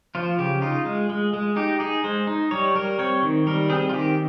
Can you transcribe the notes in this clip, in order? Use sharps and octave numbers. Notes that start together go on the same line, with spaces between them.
F3 F4
C#3 G4
D#4 F4
G#3
G#3
G#3
D#4 G4
D#4 G#4
G#3 C5
D#4
G3 C#5
G3 A#4
C4 C#5
D#3
G3 A#4
C4 G#4
F4
D#3 G4